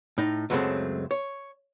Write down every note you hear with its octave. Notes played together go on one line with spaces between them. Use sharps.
A2 D#4
C#2 F#2 F#3 G#3 A3 C4
C#5